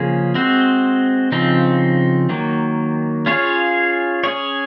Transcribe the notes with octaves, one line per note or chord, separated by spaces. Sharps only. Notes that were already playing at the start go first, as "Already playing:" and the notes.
Already playing: C#3 F3 A#3 C#4 G#4
G#3 C4 F#4 C5
C#3 F3 C4 D#4
D#3 F#3 A#3
C#4 F4 G#4 C#5 F5
C#4 G#4 C#5